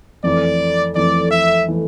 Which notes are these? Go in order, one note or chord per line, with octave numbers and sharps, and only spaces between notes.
F2 E3 A3 D5
F2 E3 A3 D5
E5
E3 A3